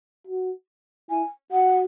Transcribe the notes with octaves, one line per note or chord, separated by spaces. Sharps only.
F#4
E4 G#5
F#4 F#5